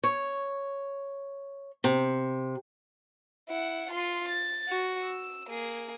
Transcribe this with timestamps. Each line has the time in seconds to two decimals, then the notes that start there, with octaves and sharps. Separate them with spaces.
0.04 C#5
1.84 C3
3.49 E4 F#5
3.91 F4 C6
4.29 A6
4.69 F#4
5.02 E6
5.48 A#3 G#4